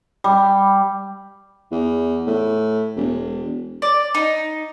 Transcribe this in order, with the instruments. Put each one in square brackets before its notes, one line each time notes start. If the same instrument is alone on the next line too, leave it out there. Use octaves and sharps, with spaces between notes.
[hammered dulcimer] G3
[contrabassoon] E2
A2
E1
[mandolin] D5
D#4